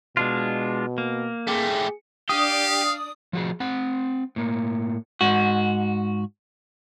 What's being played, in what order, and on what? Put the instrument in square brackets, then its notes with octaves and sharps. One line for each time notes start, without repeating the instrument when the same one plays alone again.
[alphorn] B2 [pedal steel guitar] G#3 D4 F4
[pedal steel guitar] A#3
[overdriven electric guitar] A3 G4 [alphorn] G#4
[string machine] D4 D5 [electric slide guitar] G4 [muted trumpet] F5 [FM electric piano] D#6
[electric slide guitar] F3 F#4 G#4
C4 F#5
A2 A#3
[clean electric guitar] G#2 F#4